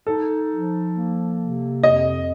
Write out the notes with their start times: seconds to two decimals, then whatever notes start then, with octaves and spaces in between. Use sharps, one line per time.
0.07 D#4 A4
0.51 F3
0.95 A#3
1.39 C3
1.83 F2 D#5